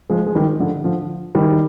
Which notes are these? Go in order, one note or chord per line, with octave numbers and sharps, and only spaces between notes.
F3 G#3
G#3
D#3 G3
D3 F3
D3 F3
D#3 G3